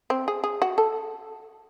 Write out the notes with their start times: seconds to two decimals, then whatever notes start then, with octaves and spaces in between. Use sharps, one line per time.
0.10 C4
0.28 G#4
0.44 G#4
0.62 F#4
0.78 A4